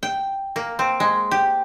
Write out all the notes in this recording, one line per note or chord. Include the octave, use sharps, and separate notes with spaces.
G5
A#3
C4
G#3
G4